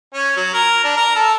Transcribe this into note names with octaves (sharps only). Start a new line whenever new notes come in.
C#4
F#3
A#4
D4
A#4
A4